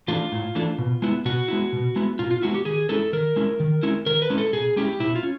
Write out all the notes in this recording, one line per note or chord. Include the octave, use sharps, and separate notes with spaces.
E3 A3 D4 F4
A2
E3 A3 D4
B2
G#3 B3 E4
B2 F#4
G#3 B3 E4
B2
G#3 B3 E4
B2 F4
F4
G#3 B3 E4 F#4
G4
D#3 G#4
G#3 C#4 E4 A4
D#3 A#4
G#3 C#4 E4
D#3
G#3 C#4 E4
D#3 A#4
B4
G#3 C#4 E4
A4
B2 G#4
G#3 C#4 E4 G4
B2 E4
F4
C#4